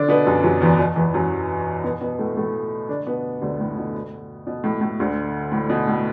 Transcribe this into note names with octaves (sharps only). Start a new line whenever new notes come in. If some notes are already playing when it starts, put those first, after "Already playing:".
Already playing: D3 D4
B2 B3
F#2 F#3
F#2 F#3
E2 E3
B2
E2 E3
F#2 F#3
B2 B3
B2 B3
A2 A3
A2 A3
D3 D4
B2 B3
D2 D3
A2
B2
B2
A2
A2
D2 D3
A2
B2
A2